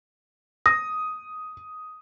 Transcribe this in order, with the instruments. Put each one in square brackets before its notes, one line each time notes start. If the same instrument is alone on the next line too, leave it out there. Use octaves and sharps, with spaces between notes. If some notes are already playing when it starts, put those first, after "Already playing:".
[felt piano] D#6 [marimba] A#6